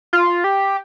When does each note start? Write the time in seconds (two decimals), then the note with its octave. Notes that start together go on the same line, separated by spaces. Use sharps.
0.13 F4
0.44 G4